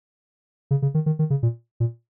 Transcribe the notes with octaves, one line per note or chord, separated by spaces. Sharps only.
C#3
C#3
D#3
D#3
D#3
C#3
A#2
A#2